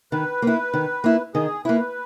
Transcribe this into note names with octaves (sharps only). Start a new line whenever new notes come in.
D#3 B4
A#3 E4
D#3
A#3 E4
D#3 G#4
A#3 E4 B4